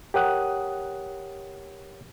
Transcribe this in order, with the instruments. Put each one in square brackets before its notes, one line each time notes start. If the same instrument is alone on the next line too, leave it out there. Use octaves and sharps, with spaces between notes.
[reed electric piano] G4 A#4 C#5 F#5 D#6 F#6